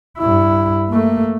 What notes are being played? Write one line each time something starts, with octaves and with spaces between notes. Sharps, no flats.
G2 E4
A3 A#3